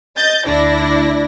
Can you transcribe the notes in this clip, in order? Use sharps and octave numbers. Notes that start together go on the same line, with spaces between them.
D#5 G6 A6
D2 D4 E4 D5 A#6